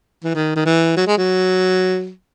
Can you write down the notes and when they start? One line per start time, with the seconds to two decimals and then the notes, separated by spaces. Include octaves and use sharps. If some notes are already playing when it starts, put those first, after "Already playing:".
0.24 E3
0.34 D#3
0.56 D#3
0.65 E3
0.97 F#3
1.07 G#3
1.17 F#3